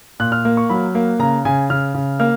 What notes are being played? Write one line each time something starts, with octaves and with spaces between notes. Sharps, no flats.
A#2 F#6
F6
A#3
C#6
F#3 B5
A#3
C#3 A#5
C#3 G#5
C#3 F6
C#3
A#3 F6